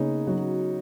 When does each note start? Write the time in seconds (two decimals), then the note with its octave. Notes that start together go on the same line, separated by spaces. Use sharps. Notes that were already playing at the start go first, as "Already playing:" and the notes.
Already playing: C#3 A#3 B3 C#4 D#4
0.27 F#3 F#4